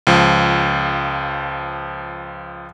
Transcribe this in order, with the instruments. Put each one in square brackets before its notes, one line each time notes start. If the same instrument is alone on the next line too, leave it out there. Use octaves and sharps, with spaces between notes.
[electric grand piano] C#2 F3